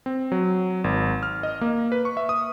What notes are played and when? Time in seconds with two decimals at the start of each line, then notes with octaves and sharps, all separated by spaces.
0.06 C4
0.32 F#3
0.84 G#1
1.23 F6
1.43 D#5
1.61 A#3
1.92 B4
2.05 C#6
2.17 E5
2.29 D#6